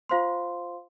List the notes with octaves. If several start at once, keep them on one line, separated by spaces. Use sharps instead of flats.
F4 C5 F5 C6